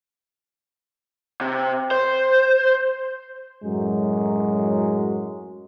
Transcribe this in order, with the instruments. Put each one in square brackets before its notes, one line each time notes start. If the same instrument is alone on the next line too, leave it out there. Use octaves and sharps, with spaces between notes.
[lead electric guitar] C3
C5
[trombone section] F#2 A2 F#3 G#3